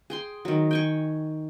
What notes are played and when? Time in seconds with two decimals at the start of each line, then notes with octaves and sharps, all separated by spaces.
0.10 G#4 G5 C6
0.45 D#3 F#3
0.71 G5 G#5 C#6